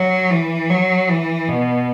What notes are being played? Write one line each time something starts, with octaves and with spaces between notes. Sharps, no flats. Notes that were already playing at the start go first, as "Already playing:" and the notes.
Already playing: F#3
E3
F#3
E3
B2